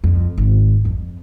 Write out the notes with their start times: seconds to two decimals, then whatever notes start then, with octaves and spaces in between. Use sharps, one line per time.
0.04 F2
0.38 G#1
0.85 F2